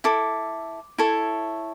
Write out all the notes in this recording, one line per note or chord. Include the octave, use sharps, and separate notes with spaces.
E4 A4 D6
E4 A4 C#5